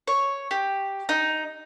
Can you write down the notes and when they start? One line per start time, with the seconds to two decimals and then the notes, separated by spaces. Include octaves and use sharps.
0.08 C#5
0.51 G4
1.09 D#4